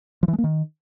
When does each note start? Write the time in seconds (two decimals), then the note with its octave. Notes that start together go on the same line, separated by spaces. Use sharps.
0.23 F3
0.28 E3
0.33 G#3
0.38 A#3
0.44 D#3